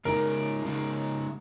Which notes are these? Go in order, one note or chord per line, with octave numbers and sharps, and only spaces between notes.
C#3 G#3 D#4 A#4
C#3 G#3 D#4